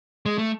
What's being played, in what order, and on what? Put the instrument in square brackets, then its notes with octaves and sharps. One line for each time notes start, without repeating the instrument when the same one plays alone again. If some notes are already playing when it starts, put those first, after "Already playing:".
[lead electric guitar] G#3
A3